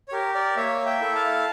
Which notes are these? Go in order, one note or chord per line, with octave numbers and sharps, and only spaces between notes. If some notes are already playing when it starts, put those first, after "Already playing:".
C#5
G4 A#4
A#4 D5
A#3 C#5 E5
E5 G5
E4 A4
F5 A5